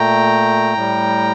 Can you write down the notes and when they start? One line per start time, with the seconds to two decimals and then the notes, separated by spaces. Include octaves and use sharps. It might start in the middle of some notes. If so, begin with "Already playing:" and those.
Already playing: A#2 A3 G5 A#5
0.74 A2 G3